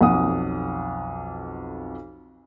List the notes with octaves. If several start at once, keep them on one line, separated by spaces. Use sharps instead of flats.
B1 F2 F#5 D#6